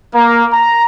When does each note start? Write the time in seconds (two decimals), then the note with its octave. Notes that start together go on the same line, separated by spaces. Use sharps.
0.13 A#3
0.50 A#5